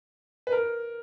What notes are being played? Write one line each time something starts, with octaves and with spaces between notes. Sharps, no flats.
B4
A#4